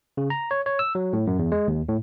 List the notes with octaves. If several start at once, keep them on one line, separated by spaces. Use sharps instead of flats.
C#3
A#5
C#5
C#5
E6
F#3
A2
F#2
E2
G#3
D#2
A2